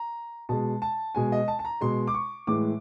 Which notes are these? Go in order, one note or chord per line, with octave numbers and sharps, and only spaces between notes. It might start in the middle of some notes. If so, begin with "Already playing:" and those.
Already playing: A#5
B2 G#3 A5
A5
B2 G#3 G#5
D#5
A5
A5
A#5
B2 G#3 C6
D6
C#6
A2 E3 G#3 D6